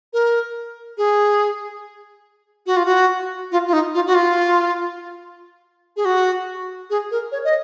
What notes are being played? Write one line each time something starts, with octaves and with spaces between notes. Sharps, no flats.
A#4
G#4
F#4
F4
F#4
F4
F4
D#4
F4
F#4
F4
G#4
F#4
G#4
A#4
C#5
D#5